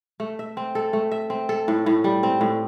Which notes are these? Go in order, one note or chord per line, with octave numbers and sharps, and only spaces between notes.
A3
E5
C4
A4
A3
E5
C4
A4
A2
A2
G3
C4
A2